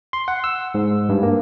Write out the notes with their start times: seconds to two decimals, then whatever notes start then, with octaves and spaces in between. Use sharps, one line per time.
0.13 C6
0.28 F#5
0.44 E6
0.75 G#2
1.09 G2
1.23 A#3